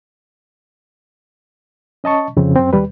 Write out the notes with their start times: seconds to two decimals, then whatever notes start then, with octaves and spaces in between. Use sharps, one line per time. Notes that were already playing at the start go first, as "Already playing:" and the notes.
2.04 C#4 D#5 A5 C#6
2.37 F2 C#3 C4
2.56 F#2 C4
2.73 D#2 G3 B4